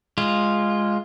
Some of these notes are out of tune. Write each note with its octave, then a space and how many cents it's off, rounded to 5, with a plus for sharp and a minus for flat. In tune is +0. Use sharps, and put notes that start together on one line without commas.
G#3 -5 F4 +0